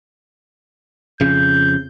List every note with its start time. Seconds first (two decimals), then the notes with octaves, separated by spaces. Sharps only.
1.21 F2 C#3 G6